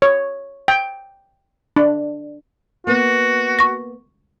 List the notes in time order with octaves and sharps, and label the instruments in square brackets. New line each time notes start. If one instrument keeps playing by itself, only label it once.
[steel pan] C#5
G5
D4
[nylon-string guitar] A#3 B3 [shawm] F#4
[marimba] C#6 A#6